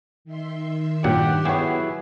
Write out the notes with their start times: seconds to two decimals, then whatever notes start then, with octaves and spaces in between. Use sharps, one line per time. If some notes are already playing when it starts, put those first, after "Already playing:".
0.25 D#3 E5 C6
1.04 G2 A#2 F#3 G4 F#5
1.45 F#3 B3 E4 G4 G#4 C#5